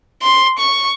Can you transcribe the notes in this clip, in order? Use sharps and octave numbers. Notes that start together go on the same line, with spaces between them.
C6
C#6